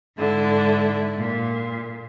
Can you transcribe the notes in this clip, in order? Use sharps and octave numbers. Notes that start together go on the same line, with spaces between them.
G#2 D3 E4
A#2